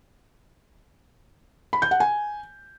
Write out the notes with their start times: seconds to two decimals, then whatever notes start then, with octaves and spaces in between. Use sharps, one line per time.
1.73 B5
1.82 G6
1.91 F#5
2.00 G#5